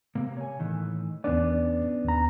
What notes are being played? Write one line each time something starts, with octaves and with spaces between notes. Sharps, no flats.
C3 A#3
C#5 G#5
A2 D#3 E3
E2 B3 C#4 D4 D5
D#2 A#5